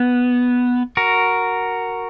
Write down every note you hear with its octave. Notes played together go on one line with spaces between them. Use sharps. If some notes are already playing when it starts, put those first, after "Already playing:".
Already playing: B3
F#4 A#4